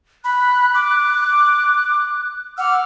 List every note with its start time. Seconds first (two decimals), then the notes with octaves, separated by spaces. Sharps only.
0.24 B5 F#6
0.74 D6
2.58 F#5 D6 E6 F6